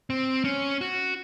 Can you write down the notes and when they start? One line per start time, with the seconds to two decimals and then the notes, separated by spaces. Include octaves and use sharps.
0.10 C4
0.44 C#4
0.81 F#4